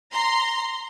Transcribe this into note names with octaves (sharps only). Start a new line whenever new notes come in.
A#5 C6